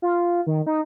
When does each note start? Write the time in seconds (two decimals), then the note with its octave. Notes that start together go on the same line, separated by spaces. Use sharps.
0.02 F4
0.47 D#3
0.67 D#4